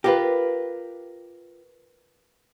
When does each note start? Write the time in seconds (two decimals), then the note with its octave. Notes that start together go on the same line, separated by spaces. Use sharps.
0.04 F4 G4 A#4 B4